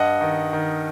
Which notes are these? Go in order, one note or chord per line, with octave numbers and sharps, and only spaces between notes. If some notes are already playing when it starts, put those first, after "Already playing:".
Already playing: G2 D#5 F#5
D#3
D#3